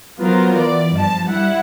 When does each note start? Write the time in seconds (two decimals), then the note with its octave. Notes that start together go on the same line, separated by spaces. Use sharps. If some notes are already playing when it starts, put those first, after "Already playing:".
0.19 F#3 B3 F4 A#4 C5
0.55 E3 D5
0.93 G2 F3 A5
1.26 G3 E4 F#5